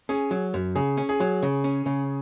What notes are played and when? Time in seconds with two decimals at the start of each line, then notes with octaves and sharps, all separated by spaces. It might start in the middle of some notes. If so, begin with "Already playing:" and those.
0.09 C#4 G#4
0.31 F#3
0.54 F#2
0.75 C#3 G#4
0.97 C#4
1.09 G#4
1.20 F#3
1.43 C#3
1.64 C#4
1.86 C#3